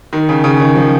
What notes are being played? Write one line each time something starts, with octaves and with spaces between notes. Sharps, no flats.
D#3
C#3
C#3
D#3
F3